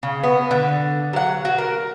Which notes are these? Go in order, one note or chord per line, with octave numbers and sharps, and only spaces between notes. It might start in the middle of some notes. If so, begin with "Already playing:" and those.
C#3
B3
D3
F#3 F#5
F#4
A#4